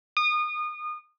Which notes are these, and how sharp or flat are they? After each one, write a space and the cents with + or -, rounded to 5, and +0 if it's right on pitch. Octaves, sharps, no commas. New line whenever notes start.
D#6 -30